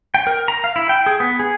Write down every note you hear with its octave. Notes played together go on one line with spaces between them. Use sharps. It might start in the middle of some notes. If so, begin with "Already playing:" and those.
G5
A#4
A#5
F5
E4
G5
G#4
B3
G#4